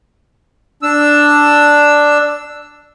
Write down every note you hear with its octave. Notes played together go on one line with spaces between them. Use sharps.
D4 E6